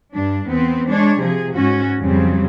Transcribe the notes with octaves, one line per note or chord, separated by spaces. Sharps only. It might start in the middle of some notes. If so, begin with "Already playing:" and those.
G2 D4
E2 B3 C4
G#3 D4 C#5
C3 F3 G#4
G#2 C#4 F#4
F2 C#3 F#3 G3 C4